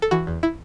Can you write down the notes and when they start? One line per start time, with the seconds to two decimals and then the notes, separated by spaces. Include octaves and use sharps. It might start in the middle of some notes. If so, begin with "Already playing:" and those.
0.02 A4
0.11 E3 F#4
0.27 E2
0.43 E4